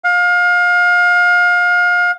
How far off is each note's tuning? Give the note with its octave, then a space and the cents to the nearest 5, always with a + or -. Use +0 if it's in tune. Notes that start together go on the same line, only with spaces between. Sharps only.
F5 +30